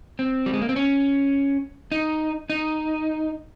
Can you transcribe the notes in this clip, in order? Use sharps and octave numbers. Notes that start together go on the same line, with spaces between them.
C4
G3
G#3
A#3
C4
C#4
D#4
D#4